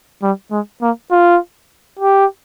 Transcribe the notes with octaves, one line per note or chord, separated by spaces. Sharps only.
G3
G#3
A#3
F4
G4